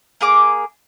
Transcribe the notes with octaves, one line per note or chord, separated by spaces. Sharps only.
A#3 G#4 D6